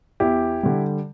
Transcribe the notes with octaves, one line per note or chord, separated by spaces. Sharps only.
E2 E4 G4
D3 G3